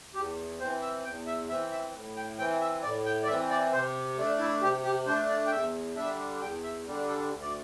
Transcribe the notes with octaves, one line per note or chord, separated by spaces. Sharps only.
E2 G4
E3 C4 C5
E5
E2 G5
E5
E3 C4 E5
E5
A2
G5
E3 C4 G5
E5
A2 D5
G5
D5
E3 C4 E5
D5
C3 C5
A3 D4
E4
C3 G4
G4
A3 D4 C5
D5
G5
E2 E5
D3 G3 D4 E5
E2 G5
E5
D3 G3 D4
A4
D2
D5